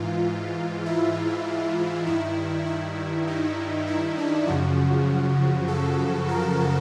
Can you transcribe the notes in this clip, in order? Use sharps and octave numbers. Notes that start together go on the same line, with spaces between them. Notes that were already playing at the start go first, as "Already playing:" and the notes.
Already playing: G#2 E3 F4
E4
G2 D#3 E4
E4
D#4
E4
D4
F#2 C#3 F3 F#4
A4
A#4